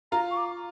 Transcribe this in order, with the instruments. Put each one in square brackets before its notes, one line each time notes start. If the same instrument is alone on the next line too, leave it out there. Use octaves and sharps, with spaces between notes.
[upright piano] F4 F5 [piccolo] A#5
[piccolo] C#6
D6